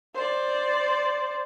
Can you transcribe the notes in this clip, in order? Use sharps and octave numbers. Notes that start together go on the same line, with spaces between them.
C5 D5